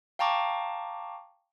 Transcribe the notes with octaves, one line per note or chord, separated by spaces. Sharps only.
F5 G5 A5 A#5 C#6 D6